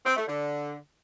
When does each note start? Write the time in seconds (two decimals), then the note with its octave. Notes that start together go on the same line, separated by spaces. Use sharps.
0.05 C4
0.16 A3
0.28 D3